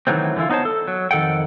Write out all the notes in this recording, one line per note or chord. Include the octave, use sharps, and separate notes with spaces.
D#3 E3 F#3 A3 C4
D3 E3 F#3 E4 F4
B3 D#4 C5 C#5 A5
A4
F#3
F2 D#3 A4 F#5 G5